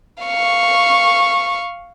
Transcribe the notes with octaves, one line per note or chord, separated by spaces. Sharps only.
F5 C#6